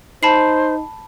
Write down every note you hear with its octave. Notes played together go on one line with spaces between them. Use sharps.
D#4 C5 A5 B5 C7